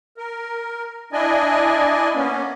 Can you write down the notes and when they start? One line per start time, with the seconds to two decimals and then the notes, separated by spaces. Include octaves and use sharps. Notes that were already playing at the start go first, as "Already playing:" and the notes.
0.17 A#4
1.13 D4 E4 D5 D#5 G#5
2.14 A#3 B3 C#4